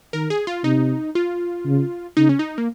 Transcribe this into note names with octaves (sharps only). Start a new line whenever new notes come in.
D#3 A#4
G#4
F4
C3 D#4
F4
C#3
C#3 D#4
C#4
D#4
A#3